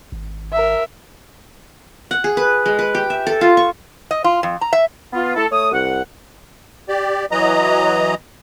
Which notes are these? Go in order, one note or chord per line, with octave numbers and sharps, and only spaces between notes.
G#1
A#4 E5
F#5
G#4
B4
G#3
B4
G4
E5
A4
F4
C#6
D#5
F4
F2
A#5
E5
B3 F4
A3 E4 A4
A3 C#5 D#6
C2 F#5
G4 D5
E3 F#3 D#5 A#5